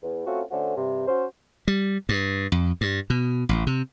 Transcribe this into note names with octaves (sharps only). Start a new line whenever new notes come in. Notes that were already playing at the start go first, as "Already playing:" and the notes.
E2
A3 C4 C#4 F4 F#4
D3 A3 C#4 F#4 C5
G2 C3
C#4 F#4 C5
G3
G2
F2
G2
B2
A1
C3